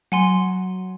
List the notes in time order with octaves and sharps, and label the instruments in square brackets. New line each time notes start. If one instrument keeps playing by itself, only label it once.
[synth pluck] F#3 [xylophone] F#5 G#5 C6